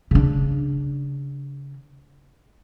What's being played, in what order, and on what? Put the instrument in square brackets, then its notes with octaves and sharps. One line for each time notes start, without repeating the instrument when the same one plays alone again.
[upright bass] C#3 D4